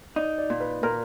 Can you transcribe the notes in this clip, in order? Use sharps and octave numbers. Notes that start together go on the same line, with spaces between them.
D#4 D5
D5
A#2
B4
A#2 A#4